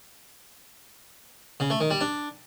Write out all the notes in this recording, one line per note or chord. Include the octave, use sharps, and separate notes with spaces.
C#3
A3
D#3
G3
D4